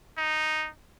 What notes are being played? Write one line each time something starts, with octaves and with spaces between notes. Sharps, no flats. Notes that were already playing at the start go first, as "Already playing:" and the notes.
D#4